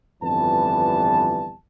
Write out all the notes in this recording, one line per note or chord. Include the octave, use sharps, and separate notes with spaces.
G1 F2 E3 G3 B3 A5